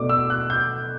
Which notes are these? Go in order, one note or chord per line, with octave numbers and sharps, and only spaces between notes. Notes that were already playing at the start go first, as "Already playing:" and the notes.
Already playing: B2 A3 D4 D6
E6
F#6
G6